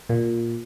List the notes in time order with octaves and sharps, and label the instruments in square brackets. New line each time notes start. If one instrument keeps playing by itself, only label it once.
[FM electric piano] A#2